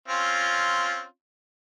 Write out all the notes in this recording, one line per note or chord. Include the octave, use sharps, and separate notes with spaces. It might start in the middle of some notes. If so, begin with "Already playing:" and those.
C4 C#4 F4